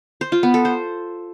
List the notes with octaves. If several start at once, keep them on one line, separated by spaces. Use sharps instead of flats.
C5
F4
B3
A4
C5